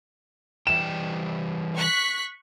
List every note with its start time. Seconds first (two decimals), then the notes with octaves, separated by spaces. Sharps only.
0.67 E3 G3 G5 E7
1.75 C#6 F#6 B6